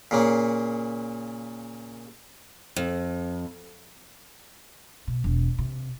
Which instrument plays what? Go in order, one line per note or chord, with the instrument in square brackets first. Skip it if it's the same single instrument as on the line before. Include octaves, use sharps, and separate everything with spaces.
[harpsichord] A#2 C#3 A#3
[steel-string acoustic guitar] F2
[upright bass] B2
E1
C3